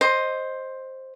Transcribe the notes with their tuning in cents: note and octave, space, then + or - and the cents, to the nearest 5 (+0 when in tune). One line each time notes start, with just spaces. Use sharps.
C5 +10 D#5 +0